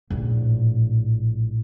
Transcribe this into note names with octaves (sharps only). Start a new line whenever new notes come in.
A#1 A2